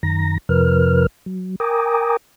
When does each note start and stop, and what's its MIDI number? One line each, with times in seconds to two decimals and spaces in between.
0.03 0.38 42
0.03 0.38 51
0.03 0.38 82
0.03 0.38 94
0.49 1.06 41
0.49 1.06 48
0.49 1.06 53
0.49 1.06 70
0.49 1.06 71
0.49 1.06 89
1.26 1.56 54
1.60 2.17 70
1.60 2.17 79
1.60 2.17 80
1.60 2.17 82
1.60 2.17 86
1.60 2.17 87